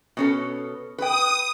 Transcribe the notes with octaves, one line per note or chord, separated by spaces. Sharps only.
B2 C#4 A4
B4 G5 D#6